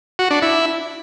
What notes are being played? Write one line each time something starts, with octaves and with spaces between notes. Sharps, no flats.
F#4
D4
E4